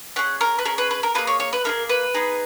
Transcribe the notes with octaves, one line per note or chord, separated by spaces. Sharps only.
C#4 G#4 F#5
A#4
B4
C#4 G#4 A#4
B4
B4
A#4
A#3 E4 G#4 B4
C#5
C#5
B4
A#3 E4 G#4 A#4
B4
B3 D#4 G#4